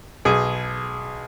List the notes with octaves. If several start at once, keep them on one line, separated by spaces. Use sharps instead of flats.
B1 G#4